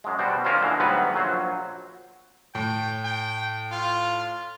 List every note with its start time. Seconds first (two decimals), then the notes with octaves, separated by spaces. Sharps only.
0.04 F#2 G#3
0.18 B2 G3 F#4 C5 D5
0.44 D#3 A#3 C#4 F4 A#4 C5
0.61 A#2 D3 E3 G#3
0.80 D2 G#2 F#3 G3 B3 B4
1.14 A#1 F#3 C5
2.55 A2 G5
3.05 G5
3.72 F4